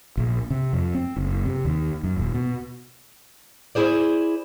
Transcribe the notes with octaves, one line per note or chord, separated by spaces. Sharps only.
A#1
C3
F2
C4
F#1
C3
D#2
F#2
D#1
B2
E4 G#4 C5 D5